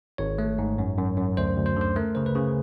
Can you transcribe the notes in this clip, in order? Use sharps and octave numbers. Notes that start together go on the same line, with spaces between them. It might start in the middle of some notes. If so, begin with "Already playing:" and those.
G#1 C#5
A3
G#2
F#2
F#2
F#2
D2 C5
D2
C5
D3 C5
A3 A#4
C#3 C5
B4
C#3